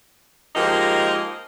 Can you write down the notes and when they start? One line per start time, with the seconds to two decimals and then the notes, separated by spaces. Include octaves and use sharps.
0.56 F3 G#3 A#3 D#4 G4 A#4